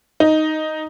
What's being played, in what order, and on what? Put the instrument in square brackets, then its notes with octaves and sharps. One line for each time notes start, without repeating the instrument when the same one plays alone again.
[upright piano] D#4